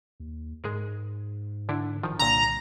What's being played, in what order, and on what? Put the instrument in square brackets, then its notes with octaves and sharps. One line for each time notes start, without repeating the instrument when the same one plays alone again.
[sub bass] D#2
[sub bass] G#2 [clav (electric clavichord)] G#3 G#4 A#4
[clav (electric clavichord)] D3 D4 E4
[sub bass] D#1 [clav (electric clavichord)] D#3 F3
[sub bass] C2 [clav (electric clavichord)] A#2 D3 [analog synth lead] A#5